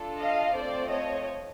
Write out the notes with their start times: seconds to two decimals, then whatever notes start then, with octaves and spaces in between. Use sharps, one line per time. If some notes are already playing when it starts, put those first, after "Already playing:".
Already playing: D4 F4 A4
0.21 D#5 F5
0.55 A3 C4 F4 A4 C5 D5
0.89 C#5 D#5